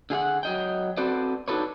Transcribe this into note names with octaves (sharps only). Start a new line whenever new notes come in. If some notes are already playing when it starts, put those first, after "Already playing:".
D3 G#4 F5 F#5
F#3 D#5 G5
C4 F#4 A4 B4 C5 D5
D4 D#4 F#4 A4 B4 C#5